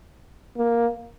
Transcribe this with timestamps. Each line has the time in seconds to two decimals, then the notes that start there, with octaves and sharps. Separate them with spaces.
0.57 A#3